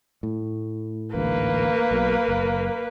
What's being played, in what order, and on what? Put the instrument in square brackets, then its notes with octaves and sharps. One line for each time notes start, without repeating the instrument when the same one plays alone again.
[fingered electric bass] A2
[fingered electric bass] A1 D2 G#2 [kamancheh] A#3 B4
[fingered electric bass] B1 B2
F#1